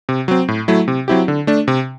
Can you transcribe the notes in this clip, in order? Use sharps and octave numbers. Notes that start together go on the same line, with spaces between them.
C3
F#3 C4
A2
F#3 A3 E4
C3
F#3 C4 E4 G4
D3
A3 D4
C3